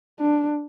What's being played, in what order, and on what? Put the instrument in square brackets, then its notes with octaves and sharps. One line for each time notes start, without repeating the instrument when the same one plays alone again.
[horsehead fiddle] D4